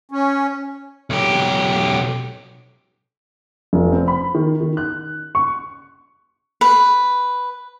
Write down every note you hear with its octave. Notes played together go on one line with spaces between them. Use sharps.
C#4
B1 G4
F1
C4
B5
D#3
D#3
F#6
C#6
B4